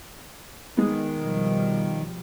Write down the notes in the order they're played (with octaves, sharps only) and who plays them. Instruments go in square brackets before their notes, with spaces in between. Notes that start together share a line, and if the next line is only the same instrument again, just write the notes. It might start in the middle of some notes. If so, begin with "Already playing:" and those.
[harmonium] D#3 [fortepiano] G#3 B3
[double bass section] B2 F3 G3